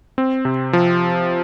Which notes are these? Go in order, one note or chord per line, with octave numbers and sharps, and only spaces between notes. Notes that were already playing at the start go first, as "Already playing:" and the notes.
C4
C3
F3